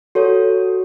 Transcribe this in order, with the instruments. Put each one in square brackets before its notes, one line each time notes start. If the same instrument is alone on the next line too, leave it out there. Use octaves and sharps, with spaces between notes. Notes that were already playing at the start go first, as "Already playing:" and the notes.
[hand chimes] F#4 A4 C#5